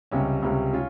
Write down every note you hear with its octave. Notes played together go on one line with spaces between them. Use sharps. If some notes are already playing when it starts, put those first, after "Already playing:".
C#2 C3 G3 C#4
C#2 C3 G3 C#4
C#4 F4